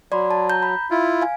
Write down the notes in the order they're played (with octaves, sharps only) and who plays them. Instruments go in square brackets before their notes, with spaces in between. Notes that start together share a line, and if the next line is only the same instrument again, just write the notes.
[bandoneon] F#3 [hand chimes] D5 B5 C6
[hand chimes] A5
A#5 G6
B5
[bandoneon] E4 F4
[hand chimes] F5 G#5